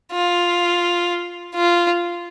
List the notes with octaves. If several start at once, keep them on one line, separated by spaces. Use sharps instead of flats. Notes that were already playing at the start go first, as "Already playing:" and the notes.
F4
F4